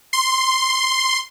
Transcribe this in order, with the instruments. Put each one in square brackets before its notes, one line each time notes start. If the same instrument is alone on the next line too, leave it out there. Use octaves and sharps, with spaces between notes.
[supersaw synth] C6